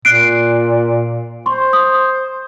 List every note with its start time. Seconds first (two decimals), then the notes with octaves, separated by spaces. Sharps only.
0.05 A#2 F#6 C7 D7
1.46 C5 C6 C#6
1.73 D#6